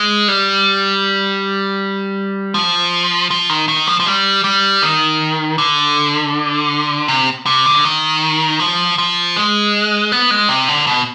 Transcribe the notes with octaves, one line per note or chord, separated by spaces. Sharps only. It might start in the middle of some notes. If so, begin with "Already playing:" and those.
Already playing: G#3
G3
F3
F3
D#3
D#3
F3
F3
G3
G3
D#3
D3
C3
C3
D3
D#3
F3
F3
G#3
B3
G#3
C3
D3
B2